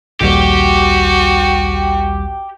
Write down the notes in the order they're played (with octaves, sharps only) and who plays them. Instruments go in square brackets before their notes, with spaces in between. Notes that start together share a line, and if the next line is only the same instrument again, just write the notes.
[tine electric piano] A#1 D#2 G3 [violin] F#4 [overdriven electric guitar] G4